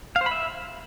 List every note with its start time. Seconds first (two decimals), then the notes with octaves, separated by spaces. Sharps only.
0.16 F5
0.21 C5
0.26 B5
0.31 E5